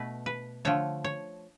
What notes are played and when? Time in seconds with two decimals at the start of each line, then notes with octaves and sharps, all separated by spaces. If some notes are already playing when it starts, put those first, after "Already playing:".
Already playing: B2 A3 B4
0.26 B4
0.65 D3 F3 A3 C#5
1.04 C#5